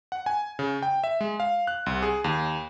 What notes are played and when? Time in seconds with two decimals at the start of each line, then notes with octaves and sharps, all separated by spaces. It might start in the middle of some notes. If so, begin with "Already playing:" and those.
0.12 F#5
0.26 G#5
0.59 C#3
0.82 G5
1.04 E5
1.21 G#3
1.40 F5
1.67 F#6
1.86 C2
2.02 G#4
2.24 D#2